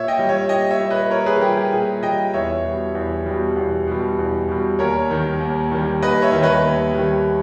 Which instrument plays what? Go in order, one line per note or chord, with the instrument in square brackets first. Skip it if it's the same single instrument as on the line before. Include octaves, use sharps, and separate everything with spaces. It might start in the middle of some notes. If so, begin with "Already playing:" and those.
Already playing: [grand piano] A#2 C#5 E5
D#5 G5
G3
C#5 E5
A#2 D#5 G5
C#5 E5
G3
B4 D#5
A#2 A#4 C#5
G#4 B4
G3 G4 A#4
G4
A#2 G#4
G3 D#5 G5
E2 C#5 E5
B2 G3
E2
B2 G3
E2
B2 G3
E2
B2 G3
D#2 A#4 C#5
D#3 G3
D#2
D#3 G3
D#2 B4 D#5
C#5 E5
D#3 G3
B4 D#5
D#2
D#3 G3